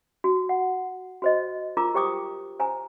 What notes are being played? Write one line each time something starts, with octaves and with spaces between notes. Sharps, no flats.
F#4
F#5
F#4 C5 D#5
F4 A#4 A#5 D6
G4 C5 G5 D6 D#6
C5 G#5 A#5